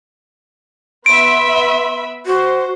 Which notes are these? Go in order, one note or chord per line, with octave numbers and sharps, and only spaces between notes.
B3 E5 B5 C6 D7
F#4 C5